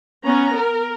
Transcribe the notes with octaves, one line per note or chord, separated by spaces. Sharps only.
B3 C#4 A#5
A#4